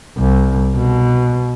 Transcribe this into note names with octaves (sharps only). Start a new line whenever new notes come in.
C2
B2